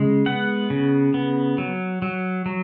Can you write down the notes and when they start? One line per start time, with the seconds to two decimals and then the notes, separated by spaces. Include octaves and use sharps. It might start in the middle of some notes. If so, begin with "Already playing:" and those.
Already playing: C#3 G#3
0.26 B3 F#5
0.70 C#3
1.14 B3
1.58 F#3
2.02 F#3
2.46 F#3